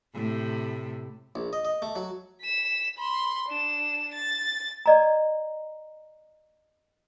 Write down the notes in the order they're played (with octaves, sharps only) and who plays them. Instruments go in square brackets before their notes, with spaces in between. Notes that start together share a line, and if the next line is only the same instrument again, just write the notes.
[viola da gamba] A2 C3
[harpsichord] A#1
D#5
D#5
A3
F#3
[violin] B6 E7
B5 C6
D4 E7
A6
[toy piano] D5 D#5 A#5